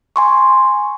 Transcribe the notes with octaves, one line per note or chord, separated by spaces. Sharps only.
G#5 C6 C#6